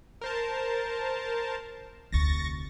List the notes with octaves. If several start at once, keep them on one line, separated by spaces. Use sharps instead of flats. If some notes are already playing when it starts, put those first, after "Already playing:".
A#4 C5 A5
F1 D2 C#6 A6 A#6